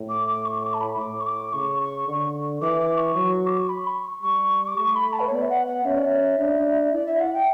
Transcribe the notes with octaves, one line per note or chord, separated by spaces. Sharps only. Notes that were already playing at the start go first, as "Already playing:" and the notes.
Already playing: A2
D6
D6
C#6
D6
A5
B5
A2 D6
C#6
D6
C#3 C#6
C#6
D3
E3 D6
D6
C#6
F#3
D6
C#6
B5
C#6
G3 C#6
D6
A3 C#6
B5
A5
B4
C#5
B3 D5
E5
F#5
F#5
C#4 E5
D5
E5
D4
E4 D5
E5
F#5
G5